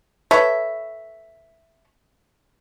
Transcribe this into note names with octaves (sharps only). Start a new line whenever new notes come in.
A4 B4 C#5 E5